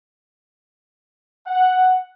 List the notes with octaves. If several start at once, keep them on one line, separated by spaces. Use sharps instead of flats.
F#5